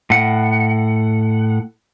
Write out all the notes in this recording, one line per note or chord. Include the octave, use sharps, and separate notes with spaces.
A2 F#5